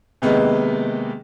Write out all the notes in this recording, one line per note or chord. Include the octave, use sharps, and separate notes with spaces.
C3 D#3 G#3 A#3 B3